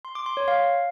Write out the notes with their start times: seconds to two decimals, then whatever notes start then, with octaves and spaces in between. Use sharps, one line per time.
0.05 C6
0.15 D6
0.26 C6
0.37 C#5
0.48 F5